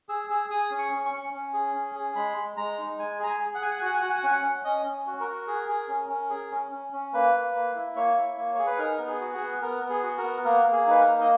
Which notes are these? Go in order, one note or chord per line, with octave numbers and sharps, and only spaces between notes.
G#4 E6
G#4 E6
G#4 D#6
C#4
C#6
C#4
C#6
C#4
C#4
G#4
C#4
G#4
G#3 B5
G#3
G#3 A#5
D#4
G#3 G#5
G#4 A#5
G#5
G#4
F#5
G#4 G#5
F#5
G#5
F#4 F#5
G#5
F#4 F#5
G#5
F#5
C#4 G#5
F#5
C#4
C#4 D#5
C#4
F#4
A#4
F#4
G#4
G#4
C#4
C#4
G#4
C#4
C#4
C#4
A#3 B4
A#3
A#3
E4
A#3 C#5
E4
A#3
G#4 C#5
B4
D#4 A#4
B3
G#4
F#4
G#4
B3
B3 A#4
B3
G#4
F#4
A#4
B3
A#3 A#4
A#3
G#4
D#4 B4
A#4
A#3
D#5